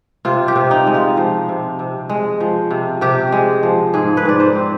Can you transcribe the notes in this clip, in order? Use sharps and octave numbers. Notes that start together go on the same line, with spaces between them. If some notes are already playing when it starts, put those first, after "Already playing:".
C3 F4
G4
C3
D#4
G#3
F4
F3
C3
C3
G#3
F3
C3
C3 G4
G#3
F3
G#2 G#4
B4
G#2 D5
C5
C4